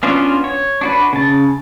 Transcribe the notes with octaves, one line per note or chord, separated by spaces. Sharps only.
B3 C#4 D4 F4 F#4
C#5
D4 F#4 B4
C#3 A5